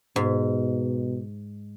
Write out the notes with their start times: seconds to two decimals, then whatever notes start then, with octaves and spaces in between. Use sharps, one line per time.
0.16 G#2 B2